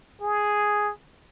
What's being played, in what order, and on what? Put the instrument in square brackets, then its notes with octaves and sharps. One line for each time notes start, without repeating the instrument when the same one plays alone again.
[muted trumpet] G#4